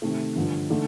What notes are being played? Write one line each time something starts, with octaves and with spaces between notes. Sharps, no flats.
C3 D#3 A3
G2 D3 F3
D3 A3 D#4